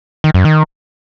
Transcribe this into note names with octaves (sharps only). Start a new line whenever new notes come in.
D#3
F#2
D#3